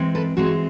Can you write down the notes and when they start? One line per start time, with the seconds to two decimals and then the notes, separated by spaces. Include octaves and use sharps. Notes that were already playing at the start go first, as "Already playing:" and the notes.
Already playing: E3 G#3 C4
0.15 A4 B4
0.37 E3 G#3 C4 F#4